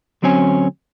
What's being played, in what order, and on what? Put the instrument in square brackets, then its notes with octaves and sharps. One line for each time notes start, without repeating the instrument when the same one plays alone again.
[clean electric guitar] D2 F#3 C4 C#4 G#5